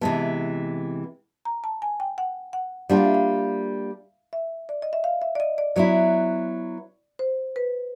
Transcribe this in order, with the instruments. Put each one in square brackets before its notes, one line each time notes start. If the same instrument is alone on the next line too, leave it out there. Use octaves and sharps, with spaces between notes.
[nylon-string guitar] C3 E3 G#3 B3 [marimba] A5
[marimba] A#5
A5
G#5
G5
F#5
F#5
[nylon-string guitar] G3 A#3 D4 F4 [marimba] F#5
[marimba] F5
E5
F5
E5
D5
D#5
E5
F5
E5
D5
D#5
D5
[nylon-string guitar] F#3 B3 E4 [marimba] D5
[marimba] C5
B4